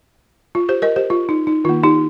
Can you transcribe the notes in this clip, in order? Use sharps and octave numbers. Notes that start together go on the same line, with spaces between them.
F4
G4 C5
A#4 D#5
G4 C5
F4
D#4
D#4
D#3 A#3 F4
D#4 G4